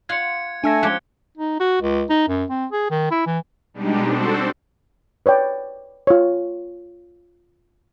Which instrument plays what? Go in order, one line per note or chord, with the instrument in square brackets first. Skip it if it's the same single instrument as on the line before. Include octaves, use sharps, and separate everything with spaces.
[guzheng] F4 F5 F#5 [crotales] G#6 C#7
[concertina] A3 G#5 [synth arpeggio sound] D4 E6 A#6
[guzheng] F3 C4 G4 [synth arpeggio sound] G#3 C#4 [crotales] F#6 G#6 G7
[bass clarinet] D#4
F#4
C#2
D#4
F#2
C4
G#4
D#3
E4
E3
[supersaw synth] B2 G3 G#3 D4 D#4 G4
C4 D4 F#4 A4 C5
[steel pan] B4 C#5 D5 G5
F4 C#5